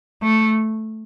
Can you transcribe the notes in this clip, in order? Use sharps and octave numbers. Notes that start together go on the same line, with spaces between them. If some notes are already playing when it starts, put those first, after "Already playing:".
A3